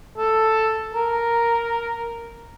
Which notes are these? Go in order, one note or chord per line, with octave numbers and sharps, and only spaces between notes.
A4
A#4